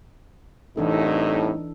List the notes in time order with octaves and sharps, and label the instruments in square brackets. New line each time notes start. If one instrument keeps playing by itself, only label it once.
[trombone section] C2 A2 [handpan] E3 D4 A4 [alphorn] D#4